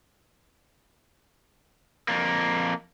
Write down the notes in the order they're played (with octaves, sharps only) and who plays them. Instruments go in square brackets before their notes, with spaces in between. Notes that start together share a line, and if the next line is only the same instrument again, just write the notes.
[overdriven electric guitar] F2 A#3